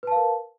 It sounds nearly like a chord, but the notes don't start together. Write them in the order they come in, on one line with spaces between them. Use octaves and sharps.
B4 A5 F5 A#4